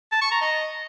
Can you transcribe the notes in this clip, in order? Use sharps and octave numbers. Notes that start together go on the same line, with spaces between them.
A5
C#6
A#5
D#5